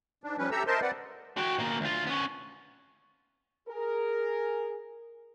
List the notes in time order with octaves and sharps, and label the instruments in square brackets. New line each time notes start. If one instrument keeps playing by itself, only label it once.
[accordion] G#2 D4
F3 G3 C#4 B4
G4 A4 E5 A#5 E6
A#4 C5 D#5 E5 A5 C6
C4 B4 D5 F#5
[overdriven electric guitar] F#4 G5
B2 A#3
D2 F4
B3 C#4
[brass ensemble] G#4 A#4